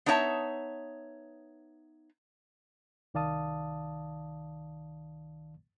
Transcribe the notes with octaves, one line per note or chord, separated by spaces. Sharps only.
B3 D4 D#4 C#5 E5 A5
C2 D#3 D5 F5 A5 D#6